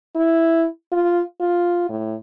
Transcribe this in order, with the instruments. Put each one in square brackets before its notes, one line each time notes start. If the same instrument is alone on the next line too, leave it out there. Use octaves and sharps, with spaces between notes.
[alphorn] E4
F4
F4
A2